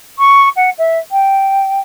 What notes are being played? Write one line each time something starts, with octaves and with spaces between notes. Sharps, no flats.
C#6
F#5
E5
G5